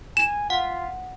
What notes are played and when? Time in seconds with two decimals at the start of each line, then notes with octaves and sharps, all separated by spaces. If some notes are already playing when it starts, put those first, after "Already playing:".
0.17 G#5 E7
0.50 F4 F#5